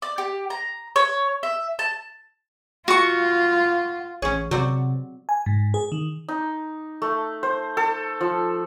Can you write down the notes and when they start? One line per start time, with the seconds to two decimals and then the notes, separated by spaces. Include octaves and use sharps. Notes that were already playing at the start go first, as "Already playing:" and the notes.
0.02 D5
0.18 G4
0.50 A#5
0.96 C#5
1.43 E5
1.79 A5
2.88 F4 F#4 C#6
4.22 A1 C#4 G#4 C#5
4.51 C3 F#3 C4 F#4 D5 F#5
5.29 G#5
5.46 G#2
5.74 G#4
5.92 D#3
6.28 D#4
7.02 A3
7.43 C5
7.77 A4
8.21 F3